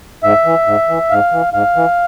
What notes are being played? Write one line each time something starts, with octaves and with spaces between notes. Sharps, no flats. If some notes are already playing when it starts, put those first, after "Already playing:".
G#2 E5
E3
G#2
E3
G#2 F5
E3
G#2 F5
E3